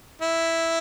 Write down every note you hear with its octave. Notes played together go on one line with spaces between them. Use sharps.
E4